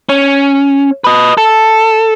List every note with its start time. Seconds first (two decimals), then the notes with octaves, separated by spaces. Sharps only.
0.09 C#4
1.04 B4 D#5
1.37 A4